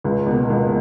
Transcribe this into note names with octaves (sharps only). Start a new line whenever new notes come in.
C#2
B2 A#3
C#2